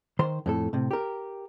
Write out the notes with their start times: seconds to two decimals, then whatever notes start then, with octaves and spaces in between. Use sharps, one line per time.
0.19 D#3 C5 C6
0.46 F2 A2 A4
0.73 A2 C3
0.91 G4 A#4